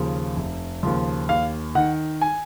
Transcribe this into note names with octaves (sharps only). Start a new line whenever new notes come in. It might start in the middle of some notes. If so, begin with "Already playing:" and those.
Already playing: D#2 C#3 F3
F1
D#2 C#3 F3
D#2 F5
D#3 F#5
G#5